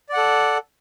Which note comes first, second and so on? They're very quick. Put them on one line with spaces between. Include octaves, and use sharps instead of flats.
D5 F#5 A4